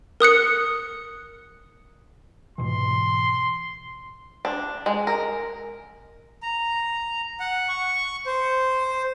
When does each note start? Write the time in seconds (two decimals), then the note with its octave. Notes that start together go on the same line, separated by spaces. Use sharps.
0.20 A#4 D#6 F#6 C#7
2.58 G#2 B2 E3 C6
4.45 D4
4.86 G#3
5.07 A#4
6.43 A#5
7.40 F#5
7.69 C#6
8.26 C5